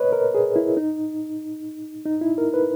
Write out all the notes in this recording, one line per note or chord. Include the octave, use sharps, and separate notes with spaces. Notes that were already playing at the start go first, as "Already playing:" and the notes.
Already playing: B4 C#5 D#5
A#4
G#4
E4
D#4
D#4
E4
A#4
B4